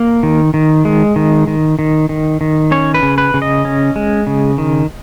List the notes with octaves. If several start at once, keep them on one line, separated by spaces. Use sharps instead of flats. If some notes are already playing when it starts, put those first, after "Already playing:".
Already playing: A#3 A#4
D#3
D#3
G#3
D#3
D#3
D#3
D#3
D#3
C#4 C#5
B4
C#3
B4
C#3
D#5
C#4
G#3
C#3
D#3